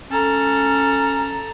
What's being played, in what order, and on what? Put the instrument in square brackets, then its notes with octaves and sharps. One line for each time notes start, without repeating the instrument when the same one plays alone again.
[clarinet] C#4 [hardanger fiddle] A4 A#5